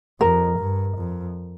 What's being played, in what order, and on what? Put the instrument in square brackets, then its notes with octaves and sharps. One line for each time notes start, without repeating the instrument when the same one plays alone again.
[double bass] F2 [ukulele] A#4
[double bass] G2
F2